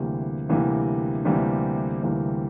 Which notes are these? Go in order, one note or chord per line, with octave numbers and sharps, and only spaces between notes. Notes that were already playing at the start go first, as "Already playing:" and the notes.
Already playing: D2 C3 E3 G3 A#3
D2 C3 E3 G3 A#3
D2 C3 E3 G3 A#3
D2 C3 E3 G3 A#3